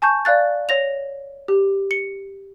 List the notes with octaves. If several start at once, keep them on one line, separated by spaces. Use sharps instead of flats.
G#5 A5 C#6 G6
D5 F5 F#6 A6
C#5 A#6 F7
G4
C#7